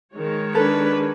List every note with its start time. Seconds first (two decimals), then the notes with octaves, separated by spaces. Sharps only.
0.13 D#3 G#3 C#5
0.55 D4 A4 B4